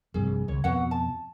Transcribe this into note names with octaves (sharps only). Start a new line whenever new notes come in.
A#1 G2 C3 G#4
C#2 C#5
F2 B2 F#4 B4 F#5
A5